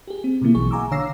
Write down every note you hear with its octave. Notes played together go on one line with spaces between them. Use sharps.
G4 G#4
C4
B2 D3 F3 A#3 E4
A#1 B2 E3 F#3 G#4 C#6
E5 F#5 G#5 A#5 D6 E6
D3 C#5 F5 E6 A#6 C7